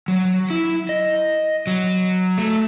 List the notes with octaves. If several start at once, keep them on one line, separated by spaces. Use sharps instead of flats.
F#3
E4
D#5
F#3
A3